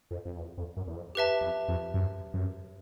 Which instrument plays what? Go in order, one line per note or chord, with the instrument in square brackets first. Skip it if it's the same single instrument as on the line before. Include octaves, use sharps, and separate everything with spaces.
[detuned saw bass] F2
F2
E2
F2
F#2
E2
F2
[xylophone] G4 B4 E5 A5
[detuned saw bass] F2
F2
F#2
F#2